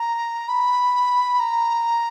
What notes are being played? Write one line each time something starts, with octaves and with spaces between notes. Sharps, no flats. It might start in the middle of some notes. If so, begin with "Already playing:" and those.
Already playing: A#5
B5
A#5